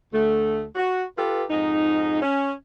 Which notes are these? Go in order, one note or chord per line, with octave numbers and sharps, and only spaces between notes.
D2 A3
F#4
F4 G4 A4 B4
F2 G#2 D#4
C#4